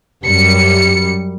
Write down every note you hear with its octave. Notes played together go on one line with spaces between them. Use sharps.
F#2 G3 C#7